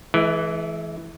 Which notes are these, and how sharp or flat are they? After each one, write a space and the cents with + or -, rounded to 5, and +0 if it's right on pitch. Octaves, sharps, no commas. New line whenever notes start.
E3 +0 G#3 +45